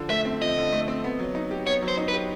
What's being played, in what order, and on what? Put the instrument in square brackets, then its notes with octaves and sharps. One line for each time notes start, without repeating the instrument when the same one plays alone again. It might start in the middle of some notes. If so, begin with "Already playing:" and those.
Already playing: [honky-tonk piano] D3 F3
[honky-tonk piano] A3 [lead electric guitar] E5
[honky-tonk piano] C4
[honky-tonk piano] F3 [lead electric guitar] D#5
[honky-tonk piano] D3
A3
C4
B3
F#3
D#4
G4
[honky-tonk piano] B3 [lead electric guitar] C#5
[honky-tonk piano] F#3
[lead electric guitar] C5
[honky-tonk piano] D#4
[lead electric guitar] B4
[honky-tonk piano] G4